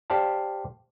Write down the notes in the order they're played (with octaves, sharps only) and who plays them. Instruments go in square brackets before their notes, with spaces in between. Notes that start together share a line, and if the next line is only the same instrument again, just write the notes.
[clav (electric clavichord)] G4 C5 D5 F5 A5